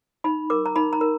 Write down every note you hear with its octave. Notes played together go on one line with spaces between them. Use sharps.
D#4 B5
A#4 D6
A#5
D#4 B5
A#5
A#4